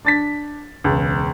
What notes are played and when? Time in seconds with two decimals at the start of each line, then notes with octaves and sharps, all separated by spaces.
0.05 D4 A6 B6
0.84 E1 C#2